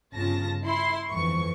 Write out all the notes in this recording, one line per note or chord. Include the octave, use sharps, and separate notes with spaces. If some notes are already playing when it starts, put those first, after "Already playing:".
G1 C#3 F4 A5 A#6
E4 C6
G1 F2 E3 C#6